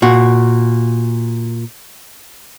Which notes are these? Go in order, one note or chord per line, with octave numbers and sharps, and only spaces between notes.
A#2 F#4